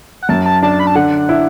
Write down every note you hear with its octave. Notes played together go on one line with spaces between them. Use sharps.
F#5
F#2 A5
A5
D4 A5
B5
A5
D3 F#5
E4